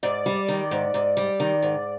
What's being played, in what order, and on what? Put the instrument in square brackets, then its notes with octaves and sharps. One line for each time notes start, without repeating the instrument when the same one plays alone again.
[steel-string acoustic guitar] G#2 [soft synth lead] D5
[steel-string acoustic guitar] G3
D#3
G#2
G#2
G3
D#3
G#2